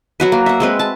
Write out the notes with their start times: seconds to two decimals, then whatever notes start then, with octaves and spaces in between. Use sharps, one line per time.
0.20 F#3 F#4 B4
0.32 A#3
0.46 E5 F#5
0.60 G#3 C4 B4
0.79 A5